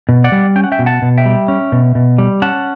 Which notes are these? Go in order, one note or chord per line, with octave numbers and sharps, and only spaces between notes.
B2
D5 F#5
G3
C#4 G5
F#5
E5 G5
B2
F#5 A5
B2
E5 G5
G3
C#4
B2
B2
G3
C#4 F#5 A5